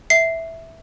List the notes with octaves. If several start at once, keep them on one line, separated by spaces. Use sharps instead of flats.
E5 C7